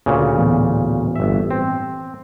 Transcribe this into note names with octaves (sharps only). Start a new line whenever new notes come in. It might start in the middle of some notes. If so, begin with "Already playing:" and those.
D2 A#2 C#3
A2 E3 B3
G1 E5
C4